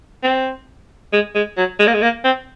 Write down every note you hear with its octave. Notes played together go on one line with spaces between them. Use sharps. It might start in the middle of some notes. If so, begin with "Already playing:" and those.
C4
G#3
G#3
F#3
G#3
A#3
G#3
A#3
C4